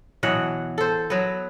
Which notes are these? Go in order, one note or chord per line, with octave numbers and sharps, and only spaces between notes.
B2 E3 F#3 F#5
A4 C5
F#3 B3